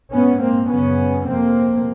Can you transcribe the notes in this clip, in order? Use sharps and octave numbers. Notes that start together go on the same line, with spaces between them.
G#2 B3 C#4
A#3 C4
F#2 C#3 B3 C#4
F2 C3 A#3 C4